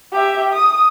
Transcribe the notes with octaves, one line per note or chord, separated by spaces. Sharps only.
G4 E5
D#6